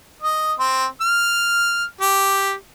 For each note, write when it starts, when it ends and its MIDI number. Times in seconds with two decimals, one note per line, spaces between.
0.22 0.53 75
0.59 0.85 60
1.01 1.84 89
2.01 2.53 67